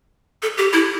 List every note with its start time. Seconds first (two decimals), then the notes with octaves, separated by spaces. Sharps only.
0.42 A4
0.58 G4
0.73 E4